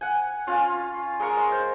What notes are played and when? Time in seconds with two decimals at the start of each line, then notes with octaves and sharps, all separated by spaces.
0.01 F#5 G#5
0.47 C#4 F4 F5
1.20 G#3 A#4 F5 C#6
1.37 D#5
1.52 C5